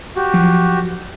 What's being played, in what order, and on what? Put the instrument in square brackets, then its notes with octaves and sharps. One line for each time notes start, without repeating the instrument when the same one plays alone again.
[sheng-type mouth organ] F#4 G4
[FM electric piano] F3 F#3